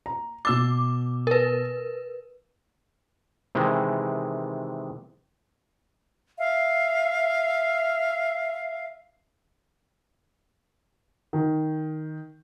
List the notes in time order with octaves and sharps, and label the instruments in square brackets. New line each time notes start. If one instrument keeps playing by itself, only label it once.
[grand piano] A#5
[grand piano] B2 E6 A6 [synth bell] D6
[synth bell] A#4 B4
[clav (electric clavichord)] C3 D#3 E3 G#3
[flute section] E5 F5
[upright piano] D#3